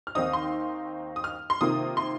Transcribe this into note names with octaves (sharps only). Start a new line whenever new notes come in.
F6
D#2 D#3 C4 D#4 D#6
C6
D#6
F6
C6
C3 D#3 A#3 F4 D#6
C6